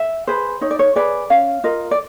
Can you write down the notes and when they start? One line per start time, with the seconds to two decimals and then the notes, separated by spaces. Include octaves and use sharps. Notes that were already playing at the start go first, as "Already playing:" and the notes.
Already playing: E5
0.27 G#4 B4 C5
0.61 D#4 C#5
0.71 D5
0.79 C#5
0.96 G#4 B4 D5
1.30 C#4 F5
1.64 F4 A#4 D#5
1.91 D5